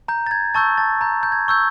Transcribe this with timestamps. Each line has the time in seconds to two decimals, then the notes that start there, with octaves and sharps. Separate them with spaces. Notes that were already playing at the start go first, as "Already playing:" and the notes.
0.08 A#5 G6
0.27 A6
0.31 G#6
0.54 A5 C#6 E6 G6 A6
0.78 A5 A6
1.01 A#5 G6
1.23 G6
1.32 G#6
1.48 C#6 E6 G6